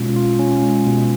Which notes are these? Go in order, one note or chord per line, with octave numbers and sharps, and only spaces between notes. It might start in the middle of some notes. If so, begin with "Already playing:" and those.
Already playing: B2 G#3 C#4 F4
F4
C#4
G#3
B2